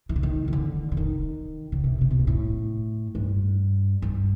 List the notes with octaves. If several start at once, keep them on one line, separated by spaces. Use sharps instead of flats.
D#3
D3
D#3
D#3
D3
D3
D#3
C#3
C3
C3
B2
A#2
A2
G2
G2